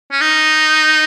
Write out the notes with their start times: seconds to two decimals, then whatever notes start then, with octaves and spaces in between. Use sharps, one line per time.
0.12 C#4
0.21 D#4